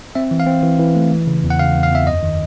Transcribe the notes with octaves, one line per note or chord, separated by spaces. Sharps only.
C4 E5
E3
F5
C4
E3
E3
A3
E3
C#3
E2
F#5
C#3 F5
E2
F5
E2 E5
F#2 D#5
D#3